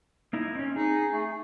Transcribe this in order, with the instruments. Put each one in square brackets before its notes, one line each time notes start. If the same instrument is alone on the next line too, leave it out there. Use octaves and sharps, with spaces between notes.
[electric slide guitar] A#3 D#4 E4
C4 C#4
[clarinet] D#4 [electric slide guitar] G#4
[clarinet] A3